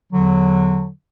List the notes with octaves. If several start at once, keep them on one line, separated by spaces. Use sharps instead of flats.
E2 D3 F#3